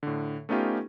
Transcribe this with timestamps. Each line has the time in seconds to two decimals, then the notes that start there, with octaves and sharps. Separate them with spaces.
0.03 A2 D3
0.49 A3 B3 C#4 D#4 F4 G4